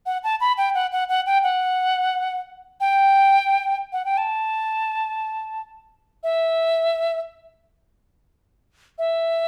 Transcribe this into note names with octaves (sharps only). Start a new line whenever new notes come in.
F#5
A5
B5
G5
F#5
F#5
F#5
G5
F#5
G5
F#5
G5
A5
E5
E5